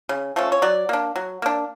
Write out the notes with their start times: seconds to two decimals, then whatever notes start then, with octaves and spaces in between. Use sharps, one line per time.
0.09 C#3
0.36 F3 A3 C#4
0.52 C#5
0.62 F#3 D5
0.89 A#3 D4
1.16 F#3
1.42 A#3 D4